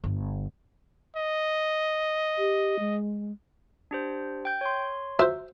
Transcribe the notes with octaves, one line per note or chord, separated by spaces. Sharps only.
G1
D#5
G4
G#3
D4 G4 C5
G5 G6
C#5 C6
F#3 F4 C5 E5